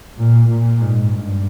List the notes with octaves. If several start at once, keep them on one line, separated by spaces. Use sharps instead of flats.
A#2
A#2
G#2
G2